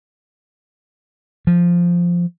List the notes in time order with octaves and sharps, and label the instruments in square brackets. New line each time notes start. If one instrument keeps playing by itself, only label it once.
[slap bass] F3